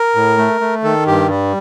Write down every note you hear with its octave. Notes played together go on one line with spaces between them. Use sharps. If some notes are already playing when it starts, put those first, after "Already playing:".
Already playing: A#4
A2
A3
A3
D#3 A4
G2 G4
G3